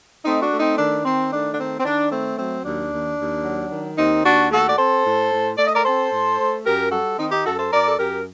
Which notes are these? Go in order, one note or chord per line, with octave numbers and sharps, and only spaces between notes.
A3 C4 D#4
D4 F#4
A3
C4 D#4
D#3 D4
D#3 C4
A3 D4
D4
D#3 C4
C4
D#3 D4
A3 C4
F#3 C4
D#2 D4
D#2
D#2
F#3
D#3
D#2 C4 D#4
D#2 D4 F#4
A3 F#4 A4
D5
C4 A4 C5
A2
A2
A3 D5
D#5
A#4 D5
C4 A4 C5
A2
A3
F#2 G4 A#4
G3 F#4 A4
D#3 C4 D#4
D#4 G4
F#2 F#4 A4
A4 C5
F#2 A#4 D5
A4
F#2 G4 A#4